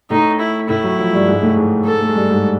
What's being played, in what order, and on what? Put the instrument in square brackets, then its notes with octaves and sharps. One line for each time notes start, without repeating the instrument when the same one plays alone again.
[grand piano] A2 A3 [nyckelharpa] D#4
[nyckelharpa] E4
[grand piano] A2 A3 [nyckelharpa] E4
[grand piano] F#3
F3
G2 G3
G#2 G#3
A2 A3
G#2 G#3
[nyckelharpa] A4
[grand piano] A3
G#3
G2 G3
G#2 G#3